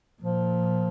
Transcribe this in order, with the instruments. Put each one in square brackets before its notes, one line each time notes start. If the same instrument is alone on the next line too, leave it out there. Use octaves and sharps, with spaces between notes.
[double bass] A#2 [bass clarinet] F3